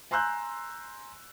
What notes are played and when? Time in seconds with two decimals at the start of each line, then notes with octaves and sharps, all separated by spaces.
0.11 G#5 A#5 C6 E6 F#6 G6